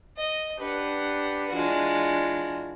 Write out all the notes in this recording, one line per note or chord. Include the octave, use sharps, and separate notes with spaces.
D#5
D4 G4 B4 F#5
E3 G#3 D4 F4 F#4